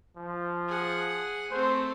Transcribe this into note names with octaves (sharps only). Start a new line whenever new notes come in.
F3
G#4 F#5
A3 C4 C5